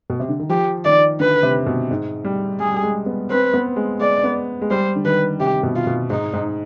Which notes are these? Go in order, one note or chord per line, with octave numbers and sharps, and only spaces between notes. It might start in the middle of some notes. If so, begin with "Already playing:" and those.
B2
C3
D3
D#3
F3 G4
D#3 D5
D3 B4
C3
B2
G#2
G3
G3 G#4
G3
G#3
B3
C4 B4
B3
G#3
G#3 D5
B3
G#3
G3 C5
D3
D#3 B4
C3 G4
B2
F4
B2
G#2 D#4
G#2